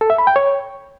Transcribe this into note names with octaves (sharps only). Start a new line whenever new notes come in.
A4
E5
B5
G5
C#5